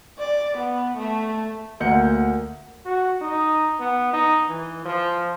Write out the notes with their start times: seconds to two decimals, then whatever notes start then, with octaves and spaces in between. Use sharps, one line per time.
0.19 D5
0.58 B3
0.98 A3
1.80 D2 A#3 F#5 G6 C#7
2.86 F#4
3.21 D#4
3.80 B3
4.13 D#4
4.48 E3
4.85 F3